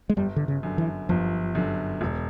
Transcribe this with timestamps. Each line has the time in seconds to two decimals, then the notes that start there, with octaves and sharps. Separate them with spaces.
0.10 G#3
0.17 G1 G3
0.36 D3
0.48 C#3
0.63 F#2 D3
0.78 E3
1.09 G1 F3
1.55 F#2 D3
2.01 E1